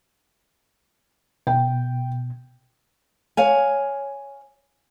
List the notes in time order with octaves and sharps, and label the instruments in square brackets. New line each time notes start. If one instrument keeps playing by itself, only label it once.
[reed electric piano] B2 [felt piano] G5
[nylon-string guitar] C#5 F5 G#5